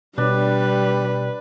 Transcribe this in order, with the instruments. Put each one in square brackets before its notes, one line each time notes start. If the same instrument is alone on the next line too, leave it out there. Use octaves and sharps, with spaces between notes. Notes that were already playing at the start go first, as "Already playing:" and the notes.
[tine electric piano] B2 [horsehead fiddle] G3 [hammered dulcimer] D4 [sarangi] B4